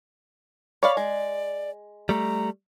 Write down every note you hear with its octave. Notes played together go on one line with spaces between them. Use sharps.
C#5 D5 F5 B5
G#3 D5
G3 A3 A#5